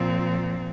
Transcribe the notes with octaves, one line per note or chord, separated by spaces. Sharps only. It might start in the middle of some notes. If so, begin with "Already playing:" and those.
Already playing: A#2 F3 C4